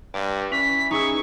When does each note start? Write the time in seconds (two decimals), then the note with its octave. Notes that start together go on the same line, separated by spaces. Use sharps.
0.14 G2 D5
0.52 E3 C#4 B6
0.91 D#4 G#4 C#6 E6